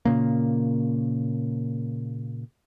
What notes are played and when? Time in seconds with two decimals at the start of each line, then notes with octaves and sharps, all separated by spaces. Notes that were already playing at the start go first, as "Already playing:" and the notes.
0.05 A#2 C#3 A#3